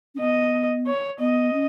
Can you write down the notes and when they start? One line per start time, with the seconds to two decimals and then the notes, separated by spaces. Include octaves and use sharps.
0.15 C#4
0.19 B3 D#5
0.87 C#5
1.19 B3 D#5
1.53 C#4